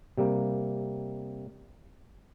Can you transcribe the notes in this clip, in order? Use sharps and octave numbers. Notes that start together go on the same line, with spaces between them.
C3 G3 A#3